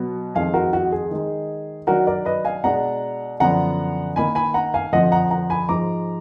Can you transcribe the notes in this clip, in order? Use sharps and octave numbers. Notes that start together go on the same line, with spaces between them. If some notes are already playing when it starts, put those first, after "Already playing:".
Already playing: B2 F#3 B3
F2 D#3 G#3 D#4 F5 G#5
F#4 A#4
F#4
G#4
D#3 G#3 D#4
D#3 F#3 D4 F#4 A#4
A#4 D5
B4 D#5
F5 G#5
B2 G#3 D4 F#5 A#5
F#2 D3 F3 B3 D4 F#5 A#5
D#3 A#3 D#4 G#5 B5
G#5 B5
F#5 A#5
F5 G#5
F2 D3 F3 D#5 F#5
F#5 A#5
F#5 A#5
G#5 B5
G#2 F3 G#3 A#5 D6